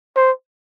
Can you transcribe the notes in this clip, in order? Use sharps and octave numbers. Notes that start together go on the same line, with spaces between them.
C5